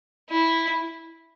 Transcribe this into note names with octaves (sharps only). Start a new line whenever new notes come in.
E4